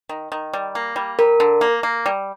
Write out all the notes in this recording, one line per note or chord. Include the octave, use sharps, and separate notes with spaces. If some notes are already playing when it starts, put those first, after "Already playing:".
D#3
D#3
G3
A#3
G3
G3 A#4
D3
A#3
A#3
G3